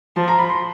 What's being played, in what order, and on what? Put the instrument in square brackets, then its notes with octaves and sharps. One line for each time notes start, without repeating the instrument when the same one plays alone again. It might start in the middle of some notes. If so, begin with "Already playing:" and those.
[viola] F3 [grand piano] A5
[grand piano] A#5
B5
C6